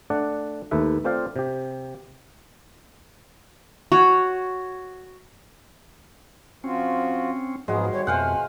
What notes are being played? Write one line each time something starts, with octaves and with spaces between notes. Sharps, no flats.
A3 D4 D5 F#5
D#2 A3 B4 E5
A3 C4 F4 C5 D5 F5
C3 G4
F#4 C#5
F3 C4 C#4 F4 F#4
G#2 F3 F#3 G#3 B3 F#4 G#4
D#3 F3 G3 C#5
F2 B2 A3 C5 F5 F#5 G#5